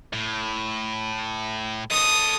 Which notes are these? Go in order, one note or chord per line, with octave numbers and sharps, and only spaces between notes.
A2
A4 D#5 D#6